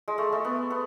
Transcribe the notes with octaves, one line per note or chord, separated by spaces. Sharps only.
G#3
A3
A3
B3
B3